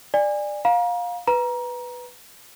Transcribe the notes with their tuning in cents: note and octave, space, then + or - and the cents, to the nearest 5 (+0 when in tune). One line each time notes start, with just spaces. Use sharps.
D5 +15 G#5 -25
F5 +20 A#5 +35
B4 +0 A#5 +25